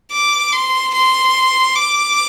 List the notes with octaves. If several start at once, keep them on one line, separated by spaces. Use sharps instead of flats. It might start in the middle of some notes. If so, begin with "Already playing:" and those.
D6
C6
C6
D6